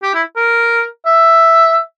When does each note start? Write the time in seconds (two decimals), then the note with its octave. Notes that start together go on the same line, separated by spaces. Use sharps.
0.03 G4
0.14 E4
0.36 A#4
1.06 E5